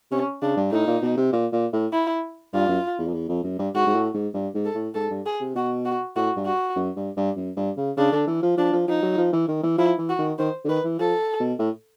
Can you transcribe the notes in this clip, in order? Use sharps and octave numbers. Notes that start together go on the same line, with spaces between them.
C3 C#4
C#3 D4
G2
A2 D#4
A#2
B2
C3
A#2
A#2
A2
E4
G2 F4
F#2
E2
F2
E2
F2
F#2
G2
G#2 F#4
G#2
A2
G#2
G2
G#2
A4
A2
G#2 A4
G2
G#4
C3
B2 F#4
F#4
A2 F#4
G2
F#4
F#2
G2
G2
F#2
G2
C#3
C#3 D4
D3
E3
F3
F3 D4
F3
F3 D#4
F#3
F3
E3
D#3
E3
F3 E4
E3
F#4
D#3
D#3 C5
D3
D#3 B4
E3
F3 A4
B2
A2